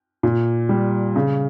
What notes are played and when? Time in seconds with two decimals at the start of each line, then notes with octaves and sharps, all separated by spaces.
0.23 A#2
0.69 G3
1.16 C#3